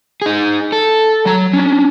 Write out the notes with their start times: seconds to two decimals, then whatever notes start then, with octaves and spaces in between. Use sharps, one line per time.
0.22 D#4 G#4
0.72 A4
1.26 F#3 A#5
1.53 C#4 D4